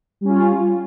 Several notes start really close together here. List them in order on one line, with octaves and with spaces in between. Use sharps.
G3 C#4 F4